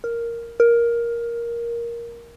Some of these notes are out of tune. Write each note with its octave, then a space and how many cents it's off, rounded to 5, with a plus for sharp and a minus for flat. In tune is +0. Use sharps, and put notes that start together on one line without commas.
A#4 +0
A#4 +10